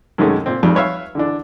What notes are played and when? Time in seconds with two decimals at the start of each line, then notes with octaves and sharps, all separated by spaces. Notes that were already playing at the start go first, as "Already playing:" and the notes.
0.18 F#2 C3 D#3 G#3 A3 C#4
0.46 A#2 C4
0.63 G#1 F2 G3
0.75 B4 C#5 E5 F5
1.15 D3 E3 D4